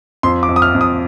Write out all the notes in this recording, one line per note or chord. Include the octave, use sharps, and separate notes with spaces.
F2 C6
D6
F2
D#6
F6
F2
D#6